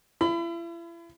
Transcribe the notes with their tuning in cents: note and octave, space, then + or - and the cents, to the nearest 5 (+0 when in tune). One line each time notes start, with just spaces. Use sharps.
E4 +40 B5 +30